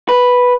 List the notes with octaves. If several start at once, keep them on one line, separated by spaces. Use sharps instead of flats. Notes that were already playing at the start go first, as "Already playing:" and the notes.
B4